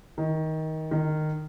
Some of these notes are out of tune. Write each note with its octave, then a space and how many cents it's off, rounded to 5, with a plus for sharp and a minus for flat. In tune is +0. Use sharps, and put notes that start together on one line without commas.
D#3 +20
D#3 -15